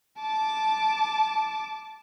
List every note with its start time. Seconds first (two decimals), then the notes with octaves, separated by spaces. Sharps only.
0.20 A5 D6